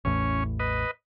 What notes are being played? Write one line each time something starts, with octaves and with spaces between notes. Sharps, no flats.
A1 E2 A2 C#4
B4 D#5